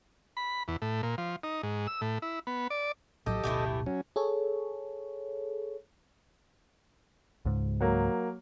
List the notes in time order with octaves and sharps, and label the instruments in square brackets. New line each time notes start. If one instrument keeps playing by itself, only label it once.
[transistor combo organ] B5
E2
A2
A#2
F3
D#4
G#2
E6
A2
E4
B3
D5
[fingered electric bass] A#1 A2 F#3 [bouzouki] G4 [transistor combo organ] A4 D#5
[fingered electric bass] D1 G1 B2 [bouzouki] E3 A3 G4
[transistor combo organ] F#3 C#4
[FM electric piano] G#4 A4 C#5
[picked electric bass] C#2 G#2
[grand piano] F#3 A#3